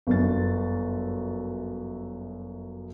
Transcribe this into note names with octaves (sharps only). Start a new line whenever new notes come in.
G1 F#2 A6